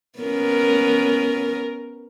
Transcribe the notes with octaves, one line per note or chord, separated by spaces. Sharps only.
B3 C#4 A#4